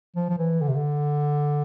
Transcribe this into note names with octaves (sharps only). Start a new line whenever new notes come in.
F3
F3
E3
D3
C3
D3